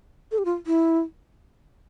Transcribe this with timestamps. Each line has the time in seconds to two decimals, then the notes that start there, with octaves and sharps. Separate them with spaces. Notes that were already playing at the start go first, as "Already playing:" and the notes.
0.32 A4
0.38 G4
0.45 F4
0.67 E4